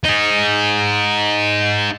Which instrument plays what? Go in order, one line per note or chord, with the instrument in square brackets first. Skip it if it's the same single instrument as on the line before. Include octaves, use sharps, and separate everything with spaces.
[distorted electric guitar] D#4 G#4